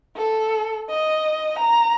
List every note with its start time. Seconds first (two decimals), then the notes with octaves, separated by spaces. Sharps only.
0.17 A4
0.90 D#5
1.59 A#5